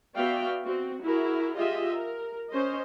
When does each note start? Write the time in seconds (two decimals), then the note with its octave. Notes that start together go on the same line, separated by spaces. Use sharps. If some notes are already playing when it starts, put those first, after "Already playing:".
0.15 B3 F#4 D5 E5 F5 G5
0.64 C4 F#4
1.03 E4 F#4 G#4 A#4
1.56 F4 G4 G#4 D#5 E5
1.93 A#4
2.49 C#4 C5 D#5